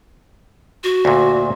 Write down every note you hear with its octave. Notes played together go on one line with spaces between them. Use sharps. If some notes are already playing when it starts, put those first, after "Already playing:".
F#4
D2 A#2